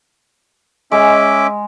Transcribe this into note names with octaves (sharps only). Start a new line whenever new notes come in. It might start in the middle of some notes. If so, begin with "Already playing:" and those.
G#3 C#4 E5 D6